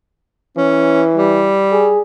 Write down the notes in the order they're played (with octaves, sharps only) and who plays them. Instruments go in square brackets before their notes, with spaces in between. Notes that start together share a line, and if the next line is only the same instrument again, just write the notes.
[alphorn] E3 [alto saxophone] C#4
[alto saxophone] G3
[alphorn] G#4